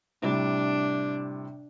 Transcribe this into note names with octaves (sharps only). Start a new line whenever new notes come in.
A2 C3 G3 D4